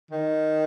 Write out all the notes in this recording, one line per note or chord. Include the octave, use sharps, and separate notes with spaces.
D#3